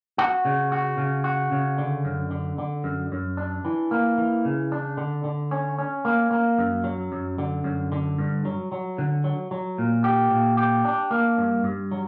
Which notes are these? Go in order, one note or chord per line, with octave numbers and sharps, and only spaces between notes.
F#4
C#3
F#4
C#3
F#4
C#3
D3
F#2
D3
D3
F#2
F#2
D4
E3
A#3
E3
C#3
D4
D3
D3
C#4
C#4
A#3
A#3
F#2
F#3
F#2
D3
F#2
D3
G2
F#3
F#3
D3
F#3
F#3
A#2
G4
A#2
G4
D4
A#3
G2
G2
F#3